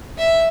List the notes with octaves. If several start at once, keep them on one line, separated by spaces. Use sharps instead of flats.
E5